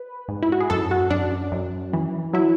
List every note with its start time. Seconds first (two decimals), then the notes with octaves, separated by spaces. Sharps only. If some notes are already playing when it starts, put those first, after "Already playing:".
Already playing: B4
0.28 G#2
0.42 E4
0.52 F#4
0.60 G#4
0.70 F#2 A4
0.91 F#4
1.10 F#2 D4
1.52 F#2
1.93 E3
2.33 F#3 E4